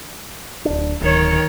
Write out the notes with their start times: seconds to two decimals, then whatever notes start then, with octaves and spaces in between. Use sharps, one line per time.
0.65 D1 D4
1.01 D1 D#3 C#5